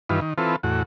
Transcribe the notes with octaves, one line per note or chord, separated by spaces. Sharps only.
G2 D#3 E3 F4 B4
D#3
E3 C4 F4 A4 B4
E2 A2 F#4